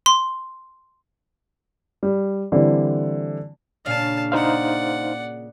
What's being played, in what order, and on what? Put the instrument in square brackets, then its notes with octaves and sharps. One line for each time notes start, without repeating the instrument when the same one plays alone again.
[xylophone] C6
[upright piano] G3
D3 E3 G3 C4
[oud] A#2 C#3 D4 [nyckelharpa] F5 A5
[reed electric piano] D#4 C5 F5 [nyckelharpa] D5 F#5